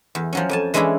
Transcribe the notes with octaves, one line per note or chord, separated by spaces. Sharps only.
E2
F3 F#3 C#4
F2 G#5 A5
E3 G#3 C#4 D4 E4 G#4